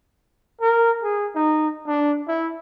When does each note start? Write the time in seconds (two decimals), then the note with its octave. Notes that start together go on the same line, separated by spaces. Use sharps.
0.61 A#4
1.03 G#4
1.35 D#4
1.87 D4
2.28 E4